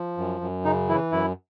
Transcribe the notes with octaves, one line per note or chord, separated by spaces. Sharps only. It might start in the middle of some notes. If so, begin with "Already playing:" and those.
Already playing: F3
F#2
F#2
C#3 D#4
E3 E4
F#2 E4